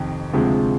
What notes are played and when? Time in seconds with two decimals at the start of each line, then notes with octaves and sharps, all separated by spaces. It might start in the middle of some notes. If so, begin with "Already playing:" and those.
Already playing: F2 C3 D#3
0.33 D2 C3 F3 G#3